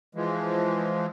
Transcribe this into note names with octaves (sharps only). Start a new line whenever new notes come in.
E3 F3 G#3